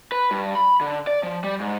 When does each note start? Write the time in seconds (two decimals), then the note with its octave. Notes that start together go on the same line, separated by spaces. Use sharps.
0.12 B4
0.31 G2
0.55 B5
0.81 D3
1.07 D5
1.23 F3
1.44 G3
1.60 G#2